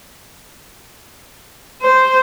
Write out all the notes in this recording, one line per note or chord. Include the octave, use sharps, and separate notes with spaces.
C5